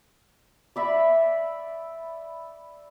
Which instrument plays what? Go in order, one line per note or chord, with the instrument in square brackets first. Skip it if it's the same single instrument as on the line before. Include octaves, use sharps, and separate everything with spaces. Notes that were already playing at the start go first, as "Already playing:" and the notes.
[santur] D5 E5 B5